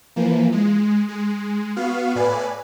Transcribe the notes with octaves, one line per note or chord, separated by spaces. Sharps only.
E3 F3 A#3
G#3
G#3
B3 F#4 F5
A2 B4 D5 G#5